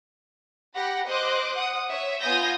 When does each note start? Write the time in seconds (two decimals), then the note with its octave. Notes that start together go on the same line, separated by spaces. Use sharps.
0.75 G4 F#5 B5 A#6
1.07 C5 D#5 D6 F#6
1.56 F#5 D#6
1.88 C#5 E5
2.21 B3 F4 G#5 D#6 G6 A#6